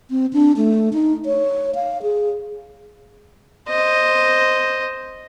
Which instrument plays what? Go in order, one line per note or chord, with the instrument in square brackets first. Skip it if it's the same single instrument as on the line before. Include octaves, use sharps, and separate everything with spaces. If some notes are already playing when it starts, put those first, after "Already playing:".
[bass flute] C4
D4
A3
D#4
C#5
F5
G#4
[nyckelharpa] C5 D#5